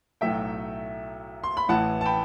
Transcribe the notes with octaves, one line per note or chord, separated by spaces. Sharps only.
B1 A2 F#3 A3 E5 G5
C6
B5
A1 A2 E3 F#5 A5
A5
G5 B5